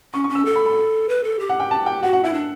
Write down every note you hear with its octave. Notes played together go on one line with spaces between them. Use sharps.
C#4 C#6
C#6
C#4
E6
A4
B5
B5
B4
A4
G4
F#5
G5
A5
G5
F#4 F#5
F#5
E4 E5
D4